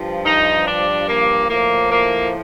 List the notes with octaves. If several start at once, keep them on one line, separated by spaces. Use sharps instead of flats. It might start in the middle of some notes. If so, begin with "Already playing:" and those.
Already playing: G2 F3
D#4
D4
A#3
A2 F3 A#3
A#3